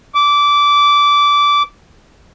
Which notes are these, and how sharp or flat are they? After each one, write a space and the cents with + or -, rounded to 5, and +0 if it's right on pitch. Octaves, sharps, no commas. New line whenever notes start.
D6 -15